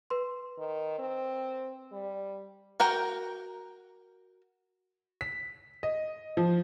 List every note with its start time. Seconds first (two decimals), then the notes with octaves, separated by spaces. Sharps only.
0.10 B4 C6
0.58 D#3
0.99 C4
1.92 G3
2.80 F#4 A#4 G5 A#5
5.21 B6
5.83 D#5
6.37 F3